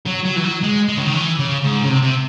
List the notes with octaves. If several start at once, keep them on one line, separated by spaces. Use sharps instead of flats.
F#3
F#3
E3
F#3
G#3
G#3
C#3
D#3
E3
C#3
G#2
C#3
C3
C3